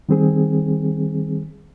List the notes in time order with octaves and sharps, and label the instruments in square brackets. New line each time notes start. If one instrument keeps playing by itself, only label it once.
[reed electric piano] D#3 G3 C4 G#4